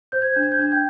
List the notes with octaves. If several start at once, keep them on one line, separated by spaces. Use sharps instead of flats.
C5 G6
G#6
D4 G6
G#6
G6
D4 G#6
G5 G6